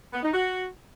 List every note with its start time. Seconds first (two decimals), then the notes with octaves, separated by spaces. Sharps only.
0.13 B3
0.23 D#4
0.33 F#4